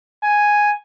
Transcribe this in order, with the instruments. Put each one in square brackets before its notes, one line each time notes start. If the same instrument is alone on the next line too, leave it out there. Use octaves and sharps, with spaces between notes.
[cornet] G#5